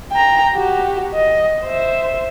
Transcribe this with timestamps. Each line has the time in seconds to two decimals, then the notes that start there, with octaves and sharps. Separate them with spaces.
0.12 G5 A#5
0.55 F#4 G4
1.14 D#5
1.65 C5 E5